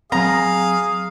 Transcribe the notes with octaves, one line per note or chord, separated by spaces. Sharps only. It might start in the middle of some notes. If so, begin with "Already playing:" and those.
F#3 C4 G#4 F5 A#5